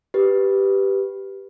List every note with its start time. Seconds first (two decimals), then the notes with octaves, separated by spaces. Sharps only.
0.14 G4 B4